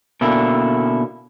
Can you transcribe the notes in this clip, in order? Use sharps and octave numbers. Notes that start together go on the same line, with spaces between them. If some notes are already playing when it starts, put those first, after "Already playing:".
B2 D3 A#3 C#4 E4